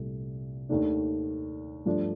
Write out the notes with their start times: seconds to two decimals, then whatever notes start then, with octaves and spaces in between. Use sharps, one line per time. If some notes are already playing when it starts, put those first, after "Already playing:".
Already playing: C2 A#2 A3
0.69 D#2 D#3 A3 D4
1.85 G2 F3 A3 D4